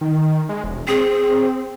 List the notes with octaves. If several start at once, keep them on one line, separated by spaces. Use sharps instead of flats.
D#3
G#3
E1
C4 G#4